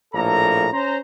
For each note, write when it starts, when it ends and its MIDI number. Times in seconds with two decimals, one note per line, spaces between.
0.14 0.67 34
0.14 0.67 45
0.14 0.67 58
0.14 0.67 69
0.14 0.67 82
0.72 0.98 61
0.72 0.98 72
0.72 0.98 82